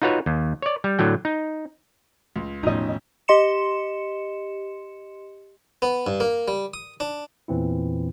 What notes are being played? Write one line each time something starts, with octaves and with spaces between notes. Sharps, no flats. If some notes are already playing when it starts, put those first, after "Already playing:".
D#4 F4 F#4 B4 C#5
D#2
C#5 D5
G3
A2 D3 F#3 G5
D#4
C#2 F4
E1 A2 D#3 F3 C#4 D#4 D#5
G4 D#5 C6 C#7 E7
B3
G2
A#3
G3
D#6
D4
E2 A#2 E3 C4 E4